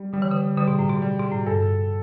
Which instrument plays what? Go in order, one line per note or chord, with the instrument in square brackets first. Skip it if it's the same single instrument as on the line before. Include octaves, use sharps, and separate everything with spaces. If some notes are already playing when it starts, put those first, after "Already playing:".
Already playing: [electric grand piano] G3
[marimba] D3 [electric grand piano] G3
[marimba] E3
D3
[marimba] D3 [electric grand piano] G3
[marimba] B2
A2
B2
[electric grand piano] G3
[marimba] B2
A2
[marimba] G2 [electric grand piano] A4